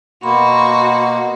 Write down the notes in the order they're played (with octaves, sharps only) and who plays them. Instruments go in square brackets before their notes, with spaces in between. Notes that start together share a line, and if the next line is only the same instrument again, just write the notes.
[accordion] B2 A#3 [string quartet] F#4 [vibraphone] B5 C6